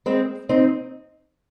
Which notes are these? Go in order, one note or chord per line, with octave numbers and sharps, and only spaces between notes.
G#3 C4
C4 D#4